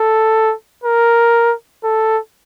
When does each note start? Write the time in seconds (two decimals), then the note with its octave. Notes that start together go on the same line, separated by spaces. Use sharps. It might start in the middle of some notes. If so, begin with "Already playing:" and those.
Already playing: A4
0.84 A#4
1.84 A4